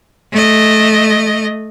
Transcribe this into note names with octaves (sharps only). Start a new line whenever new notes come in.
A3 D#5